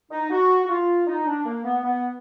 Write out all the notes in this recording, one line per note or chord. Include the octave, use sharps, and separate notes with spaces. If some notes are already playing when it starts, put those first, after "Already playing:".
D#4
F#4
F#4
F4
D#4
D4
A#3
B3
B3